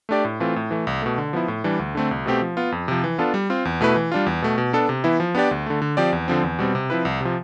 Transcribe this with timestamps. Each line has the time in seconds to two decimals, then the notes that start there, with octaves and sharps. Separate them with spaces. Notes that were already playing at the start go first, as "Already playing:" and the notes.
0.09 A3 D4 G4 D5
0.25 A2
0.40 E3 A3 C4 F4
0.56 A2
0.71 E3 A3
0.87 C2
1.02 B2 A3
1.18 D3
1.33 F3 B3 E4
1.48 A2
1.64 E3 G3 D4
1.79 D2
1.95 D3 A3 C4
2.11 C2
2.26 B2 A3 C4 G4
2.41 F3
2.57 B3 F4
2.72 F2
2.88 C3 F3
3.04 E3
3.18 B3 D4 F4 A4
3.34 G3
3.50 C4 F4
3.65 E2
3.81 B2 A3 E4 B4
3.96 E3
4.12 G3 D4 F4
4.26 E2
4.42 B2 A3
4.58 B2
4.73 B3 D4 A4
4.89 C3
5.04 E3 B3 E4
5.20 F3
5.35 B3 D4 G4 D5
5.51 D2
5.66 D3 A3
5.82 D3
5.97 F3 C4 G4 D5
6.13 E2
6.28 D3 F3 C4
6.43 E2
6.59 B2 G3 C4
6.75 C3
6.90 F3 C4 E4 B4
7.05 C2
7.21 C3 F3